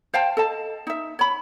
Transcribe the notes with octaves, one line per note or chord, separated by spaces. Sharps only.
C5 F5 G5 A5
A4 D#5 A5
D#4 E5
C#5 B5